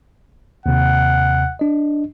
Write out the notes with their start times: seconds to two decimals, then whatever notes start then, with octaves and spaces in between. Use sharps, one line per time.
0.66 D#2 C3 F#5
1.59 D4 D#5